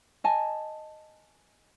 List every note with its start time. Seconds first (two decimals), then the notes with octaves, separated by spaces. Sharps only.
0.24 D#5 G#5 A5